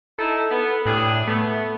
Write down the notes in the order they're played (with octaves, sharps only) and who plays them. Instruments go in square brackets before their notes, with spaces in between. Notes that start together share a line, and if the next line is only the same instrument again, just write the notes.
[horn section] D#4 E4 [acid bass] A4
[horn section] B3
[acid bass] A2 [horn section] D4 G4 G#4
[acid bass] A3 [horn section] B3